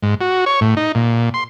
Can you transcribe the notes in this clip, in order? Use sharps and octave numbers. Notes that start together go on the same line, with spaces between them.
G#2
F#4
C#5
A2
D#4
A#2
C6